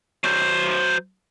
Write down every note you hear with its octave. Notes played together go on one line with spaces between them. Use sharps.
F#3 C5